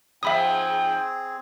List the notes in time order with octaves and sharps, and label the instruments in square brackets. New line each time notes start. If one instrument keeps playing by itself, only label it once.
[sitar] G#2 F3 [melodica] C4 G#4 [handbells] E5 B5 D#6 [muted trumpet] G5